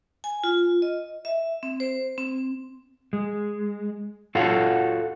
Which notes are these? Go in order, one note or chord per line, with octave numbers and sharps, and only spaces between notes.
G#5
F4
D#5
E5
C4
C5
C4
G#3
F4 F#4 A4 C#5 F5 F#5